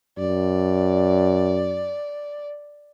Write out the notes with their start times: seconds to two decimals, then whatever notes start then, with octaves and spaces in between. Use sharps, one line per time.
0.18 F#2 D5